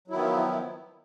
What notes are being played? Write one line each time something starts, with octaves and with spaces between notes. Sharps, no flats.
D#3 F3 F#3 B3 E4